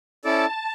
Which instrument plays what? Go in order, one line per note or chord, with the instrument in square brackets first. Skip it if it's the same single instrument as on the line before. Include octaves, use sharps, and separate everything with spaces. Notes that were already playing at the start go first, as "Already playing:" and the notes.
[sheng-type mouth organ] C#4 E4 A4 D5 [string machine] A5